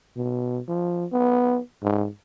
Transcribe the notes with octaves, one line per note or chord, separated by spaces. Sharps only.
B2
F3
B3
G#2